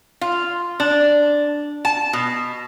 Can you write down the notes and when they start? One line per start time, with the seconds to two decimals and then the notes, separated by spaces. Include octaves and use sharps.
0.21 F4
0.80 D4
1.85 A5
2.13 B2